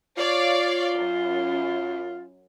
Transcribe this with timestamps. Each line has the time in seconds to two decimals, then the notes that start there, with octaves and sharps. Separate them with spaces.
0.17 F4 C#5 D5 F5
0.96 F#2